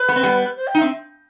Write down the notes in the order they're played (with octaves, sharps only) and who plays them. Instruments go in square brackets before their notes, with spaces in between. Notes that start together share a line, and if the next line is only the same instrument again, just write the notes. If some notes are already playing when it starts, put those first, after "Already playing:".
Already playing: [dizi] B4
[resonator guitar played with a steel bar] B3
C4
G3 B3
[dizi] C5
G5
[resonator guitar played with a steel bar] D#4
[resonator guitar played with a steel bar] C4 [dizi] E5